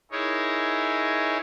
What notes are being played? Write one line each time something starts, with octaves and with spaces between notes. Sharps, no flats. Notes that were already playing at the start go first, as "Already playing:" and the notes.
D#4 E4 G#4 A#4 C#5